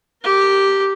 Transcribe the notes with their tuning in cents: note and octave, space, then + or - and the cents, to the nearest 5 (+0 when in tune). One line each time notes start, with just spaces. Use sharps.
G4 -5 A#4 -30